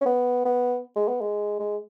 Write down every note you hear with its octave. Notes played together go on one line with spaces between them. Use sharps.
C#4
B3
B3
G#3
B3
G#3
G#3